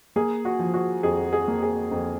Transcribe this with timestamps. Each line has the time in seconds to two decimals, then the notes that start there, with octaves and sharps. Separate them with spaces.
0.16 A#3 G#4
0.45 F#4
0.59 F3
0.74 F#4
1.03 F2 G#4
1.33 G#4
1.48 A#3
1.62 G#4
1.91 F2